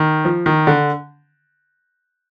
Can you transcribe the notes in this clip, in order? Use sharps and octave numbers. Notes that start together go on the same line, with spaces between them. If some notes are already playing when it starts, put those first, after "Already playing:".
Already playing: D#3
F3
D#3
D3